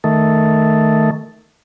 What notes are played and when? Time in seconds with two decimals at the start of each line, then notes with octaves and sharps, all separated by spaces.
0.04 D#3 A3